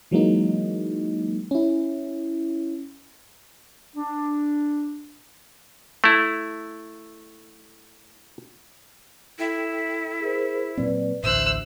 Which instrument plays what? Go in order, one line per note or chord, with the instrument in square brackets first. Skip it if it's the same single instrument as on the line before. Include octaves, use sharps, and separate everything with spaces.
[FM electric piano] E3 F#3 G#3 A#3 D#4
C#4 E4
[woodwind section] D4
[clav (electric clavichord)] A3 E4
[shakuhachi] E4 [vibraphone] A4 G5
[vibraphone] G#4 A#4 C5
[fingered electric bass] A#2 F#3 C4 [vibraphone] B4 D5
[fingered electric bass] A1 D2 A2 [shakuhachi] C5 [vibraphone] E5 [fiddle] E6 F#6